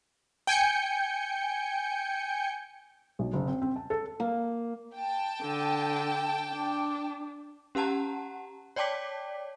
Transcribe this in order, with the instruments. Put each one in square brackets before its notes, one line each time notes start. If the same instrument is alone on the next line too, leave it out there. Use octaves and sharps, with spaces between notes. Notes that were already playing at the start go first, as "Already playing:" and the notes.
[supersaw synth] G5 G#5 G6 C#7
[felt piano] B1
F#1
C4
C4
A5
A4
[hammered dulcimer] A#3
[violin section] G5 A5
[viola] D3
D4
[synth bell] C#4 G4 F#5 A5 A#5
C#5 D5 G5 A5 D6 B6